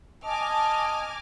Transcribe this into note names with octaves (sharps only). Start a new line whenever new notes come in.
D#5 G#5 A5 D6 F6